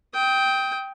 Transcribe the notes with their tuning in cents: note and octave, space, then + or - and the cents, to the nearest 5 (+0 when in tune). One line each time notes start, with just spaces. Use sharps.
G5 +0 D#6 +35